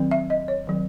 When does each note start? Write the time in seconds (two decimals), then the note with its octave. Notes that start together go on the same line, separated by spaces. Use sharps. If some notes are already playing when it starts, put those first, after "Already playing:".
Already playing: D#3 F#3 C4
0.11 E5
0.30 D#5
0.48 C#5
0.67 D#3 F#3 C4